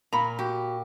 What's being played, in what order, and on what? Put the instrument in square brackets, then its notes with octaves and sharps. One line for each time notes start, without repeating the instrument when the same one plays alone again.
[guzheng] A#2 [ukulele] A#5 B5
[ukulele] F#4 [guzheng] G4